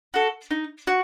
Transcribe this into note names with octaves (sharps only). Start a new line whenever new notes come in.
F#4 A4
D#4
F#4